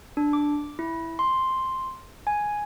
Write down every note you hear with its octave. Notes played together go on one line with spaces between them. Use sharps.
D4
D6
E4
C6
G#5